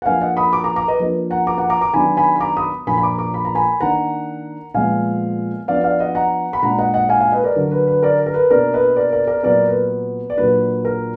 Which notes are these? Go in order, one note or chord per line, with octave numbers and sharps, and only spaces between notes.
F#5
F3 A#3 D4 F5 G#5
D#5 F#5
B5 D#6
A#5 D6
A#5 D6
A#5 D6
B4 D#5
F3 A#3 D4 B4
F#5 A#5
A#5 D6
F#5 A#5
A#5 D6
A#5 D6
D#3 F#3 B3 D4 G#5 B5
G#5 B5
B5
A#5 D6
B5 D#6
A#2 F3 A#3 D4 G#5 B5
B5
A#5 D6
A#5 D6
B5
A#5
G#5 B5
D#3 A#3 D4 F#5 A#5
A#2 F3 G#3 B3 F5 G#5
F3 B3 D4 D5 F5
D5 F5
D#5 F#5
F#5 A#5
B5
A#2 G#3 D4 F#5 A#5
D#5 F#5
D#5 F#5
F5 G#5
F5 G#5
B4 D#5
A#4 D5
D3 F#3 D4 A#4
B4
B4
A#4 D5
A#4
B4
B2 A#3 D4 A#4 D5
B4 D#5
A#4 D5
A#4 D5
A#4 D5
A#2 F#3 B3 A#4 D5
B4
D5
A#2 F#3 A#3 D4 B4
A#4